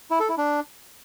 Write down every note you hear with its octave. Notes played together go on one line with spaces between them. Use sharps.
E4
A4
E4
D4